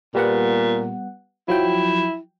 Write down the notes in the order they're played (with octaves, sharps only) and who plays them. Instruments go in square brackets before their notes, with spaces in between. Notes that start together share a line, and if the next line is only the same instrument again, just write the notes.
[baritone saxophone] A#2 [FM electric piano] G3 B3 F#5
[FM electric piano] F3 F#3 G5 [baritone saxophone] E4